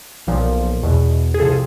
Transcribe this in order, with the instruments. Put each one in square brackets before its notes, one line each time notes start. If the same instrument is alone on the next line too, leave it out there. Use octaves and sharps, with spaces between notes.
[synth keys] B1 A#2 F3
E2 B2
G#4
C2 C3 F3 A4